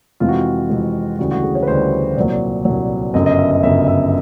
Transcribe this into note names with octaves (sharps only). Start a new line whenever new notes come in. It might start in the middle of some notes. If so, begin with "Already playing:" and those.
F2 C3 E3 G#3 F4
F#4
F4
F2 C3 E3 G#3
D2 C#3 E3 G3 F#4
F#4
G#4
C#5
B4
D2 C#3 E3 G3 C5
C2 A#2 F#3 D5
C2 A#2 F#3
G1 F#2 C#3 D#5
D#5
E5
D#5
G1 F#2 C#3 E5
E5